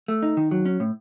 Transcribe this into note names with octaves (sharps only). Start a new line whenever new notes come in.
A3
D#4
D#3
F#3
C#4
A2